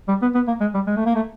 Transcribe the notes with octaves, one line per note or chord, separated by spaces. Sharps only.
G3
B3
B3
A#3
G#3
G3
G#3
A3
A#3
A3